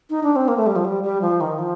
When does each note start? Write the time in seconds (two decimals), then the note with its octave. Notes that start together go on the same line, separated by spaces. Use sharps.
0.10 D#4
0.23 D4
0.36 C4
0.48 A#3
0.57 A3
0.66 G3
0.76 F3
0.85 G3
1.03 G3
1.21 F3
1.41 D#3
1.59 F3